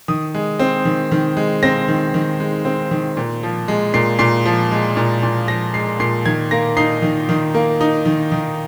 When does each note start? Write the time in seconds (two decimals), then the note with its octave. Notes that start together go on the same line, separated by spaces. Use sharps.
0.08 D#3 D#6
0.34 G#3
0.59 C4
0.85 D#3
1.11 D#3
1.37 G#3
1.63 C4 A#6
1.88 D#3
2.14 D#3
2.40 G#3
2.65 C4
2.91 D#3
3.17 A#2
3.43 F3
3.68 G#3
3.94 A#2 C7
4.19 A#2 C7
4.46 F3
4.71 G#3
4.97 A#2
5.23 A#2
5.48 F3 A#6
5.74 G#3 C7
6.00 A#2 C7
6.26 D#3 G#6
6.51 A#3 A#6
6.77 D#4 C7
7.02 D#3
7.29 D#3
7.54 A#3
7.81 D#4
8.06 D#3
8.32 D#3